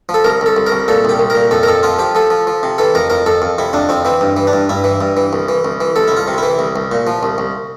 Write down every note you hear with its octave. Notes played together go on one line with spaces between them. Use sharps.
F3
A4
C2 A#4
C2 A4
C2
A#4
C2
A#2 A4
C2 G4
C2
A#4
A#2
F2 A4
A#4
F2 A4
F3 F4
F3 G4
F3 A4
F3
F3
C3
E3 A4
F2 A#4
F2 A#4
F2 A4
F2
C3 E4
F2 D4
F2 C4
E3 C4
G2
E3
D4
G2
G2 E4
E3
G2
E3
C2
E3
C2
E3
C2 A4
E4
C2 F4
C3
E3 E4
C2
C2
A#2
F3
C2
C2